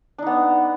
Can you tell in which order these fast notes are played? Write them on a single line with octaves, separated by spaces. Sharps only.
D4 D#4 B3